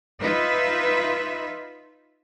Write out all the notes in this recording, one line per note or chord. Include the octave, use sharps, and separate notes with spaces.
D#4 F4 B4 E5